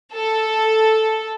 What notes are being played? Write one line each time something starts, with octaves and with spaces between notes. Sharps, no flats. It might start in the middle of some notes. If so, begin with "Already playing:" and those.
A4